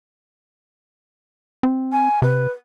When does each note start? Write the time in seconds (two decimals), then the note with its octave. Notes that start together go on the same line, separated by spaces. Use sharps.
1.63 C4
1.92 G#5
2.22 C3 B4